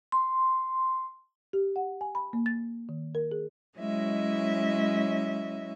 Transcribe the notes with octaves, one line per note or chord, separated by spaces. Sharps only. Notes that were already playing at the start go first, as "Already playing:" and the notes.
C6
G4
F#5
G#5
B5
A#3
A6
D#3
A#4
G#4
F#3 G#3 C#4 E4 D#5 E5